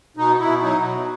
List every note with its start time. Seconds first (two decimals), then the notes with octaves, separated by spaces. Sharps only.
0.17 B2 D#4
0.39 B2 E4
0.61 F#3 D#4
0.84 B2